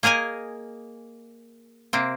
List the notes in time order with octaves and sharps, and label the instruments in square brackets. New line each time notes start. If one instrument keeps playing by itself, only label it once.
[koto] A#3 G#4 A#4 D#5 G#5
C3 A#3 C4